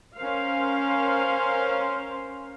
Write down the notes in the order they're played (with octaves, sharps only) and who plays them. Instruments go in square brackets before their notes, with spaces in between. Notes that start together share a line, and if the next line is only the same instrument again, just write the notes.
[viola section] C#4 A#4 C5 F5